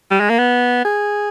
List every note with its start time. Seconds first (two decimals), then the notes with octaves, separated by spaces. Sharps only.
0.11 G3
0.20 G#3
0.30 A#3
0.39 B3
0.85 G#4